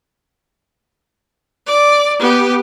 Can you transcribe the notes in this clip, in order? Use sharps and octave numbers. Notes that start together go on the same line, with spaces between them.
D5
B3 G4